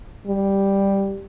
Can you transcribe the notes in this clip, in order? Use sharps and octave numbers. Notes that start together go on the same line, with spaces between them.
G3